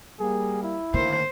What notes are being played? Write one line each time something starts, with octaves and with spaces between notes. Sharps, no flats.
G3 A#3 G#4
E4
D2 A2 D#3 A#3 C5